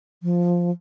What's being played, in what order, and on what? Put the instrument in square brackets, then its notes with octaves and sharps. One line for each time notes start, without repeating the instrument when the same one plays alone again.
[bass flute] F3